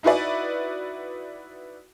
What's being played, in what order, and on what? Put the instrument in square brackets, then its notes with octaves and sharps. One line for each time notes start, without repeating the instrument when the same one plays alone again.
[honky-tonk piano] D#4 E4 F#4 B4 D5